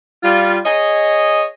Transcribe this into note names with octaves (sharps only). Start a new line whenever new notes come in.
G3 F4
G#4 C#5 D#5